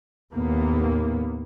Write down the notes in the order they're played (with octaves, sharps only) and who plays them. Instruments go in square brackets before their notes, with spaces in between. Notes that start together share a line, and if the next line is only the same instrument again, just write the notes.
[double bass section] D#2 A2 A#3 B3